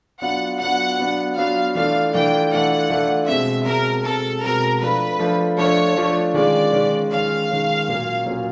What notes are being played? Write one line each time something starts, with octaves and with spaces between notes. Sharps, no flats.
F#3 B3 D4 F4 F#5
F#3 B3 D4 F4 F#5
F#3 B3 D4 F4
F#3 B3 D4 F4 F5
E3 A3 D4 F4 F5
E3 A3 D4 F4 G5
E3 A3 D4 F4 F#5
E3 A3 D4 F4
B2 G#3 C4 E5
B2 G#3 C4 A#4
B2 G#3 C4 A4
B2 G#3 C4 A#4
F3 A3 D4 F4 B4
F3 A3 D4 F4
F3 A3 D4 F4 C#5
F3 A3 D4 F4
D#3 G#3 C#4 F4 D5
D#3 G#3 C#4 F4
D#3 G#3 C#4 F4 F5
D#3 G#3 C#4 F4
A#2 F#3 A#3 C#4 F4
A#2 F#3 A#3 C#4 F4